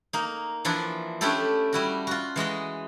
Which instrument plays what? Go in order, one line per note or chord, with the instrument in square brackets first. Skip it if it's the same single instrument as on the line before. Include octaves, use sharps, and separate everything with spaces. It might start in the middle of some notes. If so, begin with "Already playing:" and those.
[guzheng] A#3 D#4
E3 F3 D4 E4
A3 C#4 D4 E4 G4 A4
G3 E4 F#4
F4 F#4
E3 G#3 F#4 D#5